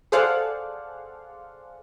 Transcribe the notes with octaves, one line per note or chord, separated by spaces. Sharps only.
G#4 A4 C5 D5 F5 F#5